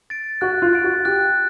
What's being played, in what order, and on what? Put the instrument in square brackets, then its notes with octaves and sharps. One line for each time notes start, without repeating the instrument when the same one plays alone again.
[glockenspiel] A6 D7
[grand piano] F#4 [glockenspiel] F#6
[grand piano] F4
[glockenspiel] A6 D7
[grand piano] F#4
[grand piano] G4 [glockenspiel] F#6